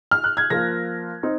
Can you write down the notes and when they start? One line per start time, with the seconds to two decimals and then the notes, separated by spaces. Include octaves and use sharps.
0.11 F6
0.24 F#6
0.37 G#6
0.50 F3 A#3 F4 A#6
1.23 C4 D#4